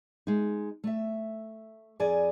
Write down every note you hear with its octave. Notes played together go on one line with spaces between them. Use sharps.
G#3 D#4
A3 E5
F2 G#4 D5 G#5